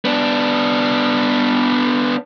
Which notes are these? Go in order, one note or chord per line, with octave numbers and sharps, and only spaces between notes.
B3 D4